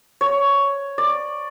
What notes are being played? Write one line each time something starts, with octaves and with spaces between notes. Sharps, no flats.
C#5
D5